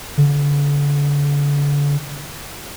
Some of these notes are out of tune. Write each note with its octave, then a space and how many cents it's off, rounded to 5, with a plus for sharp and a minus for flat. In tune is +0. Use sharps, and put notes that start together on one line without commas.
D3 -35